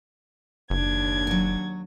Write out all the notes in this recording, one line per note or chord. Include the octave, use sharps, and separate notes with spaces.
F#1 D#2 D4 G#6
F#3 F#4